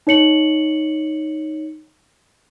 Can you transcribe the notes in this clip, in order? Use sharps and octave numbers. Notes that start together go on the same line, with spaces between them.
D#4 C#5 C#7 F#7